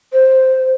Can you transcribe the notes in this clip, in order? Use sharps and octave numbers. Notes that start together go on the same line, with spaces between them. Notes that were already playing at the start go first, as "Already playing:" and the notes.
C5